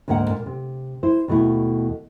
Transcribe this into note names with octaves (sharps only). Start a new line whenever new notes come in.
D2 G#2 A#3 F5 F#5
A#2
C3
E4 C5
D#2 B2 A3 E4